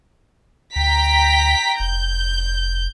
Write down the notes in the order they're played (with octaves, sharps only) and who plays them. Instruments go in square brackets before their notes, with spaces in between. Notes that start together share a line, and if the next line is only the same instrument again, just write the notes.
[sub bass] D2 [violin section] G5 A#5 B6
[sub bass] F1 [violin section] G6